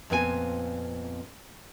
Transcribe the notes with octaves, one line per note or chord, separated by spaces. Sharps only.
F2 A#2 B3 C4 G4 G#5